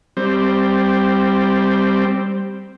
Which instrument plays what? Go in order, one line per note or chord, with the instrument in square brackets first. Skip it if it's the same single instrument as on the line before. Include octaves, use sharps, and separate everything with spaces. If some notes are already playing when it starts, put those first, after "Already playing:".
[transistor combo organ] G3 C4